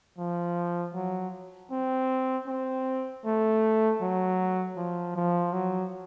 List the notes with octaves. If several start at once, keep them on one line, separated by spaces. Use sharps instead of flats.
F3
F#3
C4
C4
A3
F#3
F3
F3
F#3